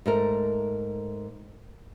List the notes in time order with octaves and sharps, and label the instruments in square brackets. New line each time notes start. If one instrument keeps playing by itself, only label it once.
[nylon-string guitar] G#2 A3 A#4